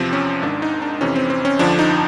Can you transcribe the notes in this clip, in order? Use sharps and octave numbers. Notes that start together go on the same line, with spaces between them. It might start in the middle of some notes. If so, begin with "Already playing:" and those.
Already playing: E2 C3 F3 C4
C#4
G#1 G#2 D#3 D4
D#4
D4
F2 C3 E3 C#4
C4
C4
C#4
G1 F2 D3 F3 D4
D#4